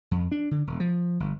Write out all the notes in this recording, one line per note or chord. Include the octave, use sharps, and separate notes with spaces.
F2
D4
D3
E1
F3
G1